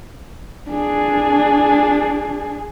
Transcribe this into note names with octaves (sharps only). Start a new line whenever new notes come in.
D4 G#4